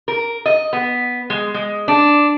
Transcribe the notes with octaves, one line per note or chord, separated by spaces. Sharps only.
A#4
D#5
B3
G#3
G#3
D4